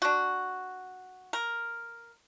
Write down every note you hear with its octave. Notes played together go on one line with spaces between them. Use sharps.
D4 F#4
A#4